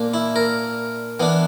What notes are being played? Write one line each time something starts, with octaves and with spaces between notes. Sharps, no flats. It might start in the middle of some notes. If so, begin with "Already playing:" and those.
Already playing: A#2 A#3 D4
E4
A#4
E3 B3 D4